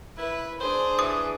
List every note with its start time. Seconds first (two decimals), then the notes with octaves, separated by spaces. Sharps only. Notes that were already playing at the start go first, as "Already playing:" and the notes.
0.18 E4 B4
0.61 D4 G#4 C5
0.99 E3 D#6